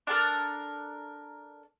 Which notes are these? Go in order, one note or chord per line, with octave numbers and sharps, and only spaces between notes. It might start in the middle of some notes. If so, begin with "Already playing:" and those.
D4 A4 A#4